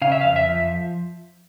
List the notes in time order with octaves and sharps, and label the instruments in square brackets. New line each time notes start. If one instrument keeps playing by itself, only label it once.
[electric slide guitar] C#3 F5
E5
F2 F5
E5
F3